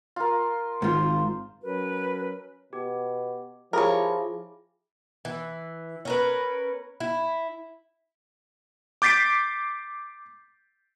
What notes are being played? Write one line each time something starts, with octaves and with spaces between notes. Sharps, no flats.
F4 A#4
G#1 G#2 F4 C5
F#3 C#4 F#4 A#4 B4
B2 G4
F3 E4 G4 G#4 A#4 C#5
E3
C#4 A#4 B4
E4
D6 G6 A6 B6 C7 D7